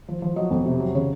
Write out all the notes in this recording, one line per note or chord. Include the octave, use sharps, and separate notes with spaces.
F3
F3
F#3 D#5
F2
C3
F#3
C#3 C#5